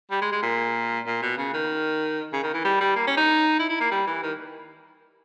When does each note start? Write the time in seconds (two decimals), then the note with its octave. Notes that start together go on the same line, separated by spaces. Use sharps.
0.11 G3
0.22 G#3
0.32 G#3
0.43 A#2
1.07 A#2
1.22 B2
1.38 C#3
1.54 D#3
2.33 C#3
2.43 D#3
2.54 E3
2.64 G3
2.81 G3
2.96 A#3
3.07 C#4
3.17 D#4
3.60 E4
3.70 E4
3.81 A#3
3.92 G3
4.07 E3
4.23 D#3